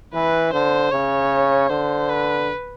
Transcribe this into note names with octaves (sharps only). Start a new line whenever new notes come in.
E3 B4
D3 C5
C#3 C#5
D3 C5
B4